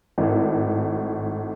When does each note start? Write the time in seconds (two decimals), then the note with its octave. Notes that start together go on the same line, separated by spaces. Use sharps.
0.18 G#1 A2